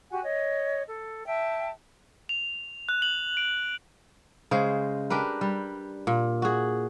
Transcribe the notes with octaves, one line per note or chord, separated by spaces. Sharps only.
F#4 G4 F#5 G#5
C#5 D#5
A4
E5 G5 A5
F7
F#6
F#7
D7
C#3 G#3 C5
D4 G4 A#4 B4
G3
A#2
F#4 G#4